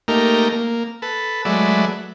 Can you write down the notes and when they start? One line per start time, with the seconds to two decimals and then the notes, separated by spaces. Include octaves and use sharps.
0.08 A3 A#3 D#4 G4 A#4
0.52 A#3
1.02 A4 B4
1.45 F#3 G#3 A3 B4 D5 E5